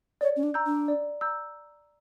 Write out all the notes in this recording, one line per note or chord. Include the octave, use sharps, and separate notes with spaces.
C#5 D5
C#4
D4
A#5 E6 G6
D4
D5
A#5 E6 G6